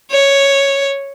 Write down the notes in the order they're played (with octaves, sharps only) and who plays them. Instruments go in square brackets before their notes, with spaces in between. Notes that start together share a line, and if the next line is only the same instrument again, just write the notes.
[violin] C#5